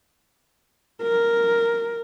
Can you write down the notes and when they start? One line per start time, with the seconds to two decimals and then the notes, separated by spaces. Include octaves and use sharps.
1.02 A#4